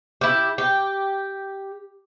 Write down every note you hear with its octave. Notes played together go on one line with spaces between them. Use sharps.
E4 G4
G4